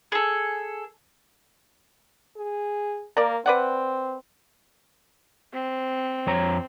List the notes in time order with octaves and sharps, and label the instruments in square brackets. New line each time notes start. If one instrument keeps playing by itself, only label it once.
[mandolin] G#4 A4
[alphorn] G#4
[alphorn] A#3 [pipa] A#4 D5
[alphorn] C4 [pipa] B4 D5 F#5
[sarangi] C4
[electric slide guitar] F2 C#5 A#5